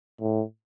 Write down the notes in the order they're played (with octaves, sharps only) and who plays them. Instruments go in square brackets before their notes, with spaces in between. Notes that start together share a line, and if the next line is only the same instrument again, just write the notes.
[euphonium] A2